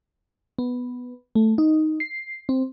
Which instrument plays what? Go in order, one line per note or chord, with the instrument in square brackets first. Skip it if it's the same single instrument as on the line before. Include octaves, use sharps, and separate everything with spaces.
[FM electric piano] B3
A3
D#4
C7
C4